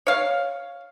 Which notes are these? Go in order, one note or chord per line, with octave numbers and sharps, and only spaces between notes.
C#5 F5